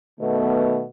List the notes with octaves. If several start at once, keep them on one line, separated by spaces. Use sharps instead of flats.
B2 D#3 A3 B3